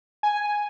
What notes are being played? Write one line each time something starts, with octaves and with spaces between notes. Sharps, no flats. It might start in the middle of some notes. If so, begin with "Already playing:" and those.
G#5